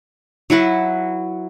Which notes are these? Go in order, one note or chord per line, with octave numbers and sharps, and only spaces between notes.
F#3 E4 F#4 B4